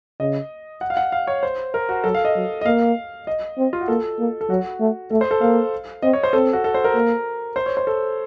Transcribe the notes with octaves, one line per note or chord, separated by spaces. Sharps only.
C#3 D#5
F#5
F5
F#5
F5
C#5
C5
A#4
F#4
F#3 A4
F5
D#5
F#3
D#5
A#3 F5
D#5
C4
F4
F#4
A#3 A4
A#3
A4
F#3 F#4
A3
A3 A4
C5
A4
A#3 F5
C4 D#5
C#5
C5
C4 A4
F#4
A4
C5
A#4
A#3
C5
C#5
C5
A4